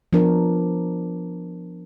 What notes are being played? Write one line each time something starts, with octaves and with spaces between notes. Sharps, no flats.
F3 B3 D4 A#4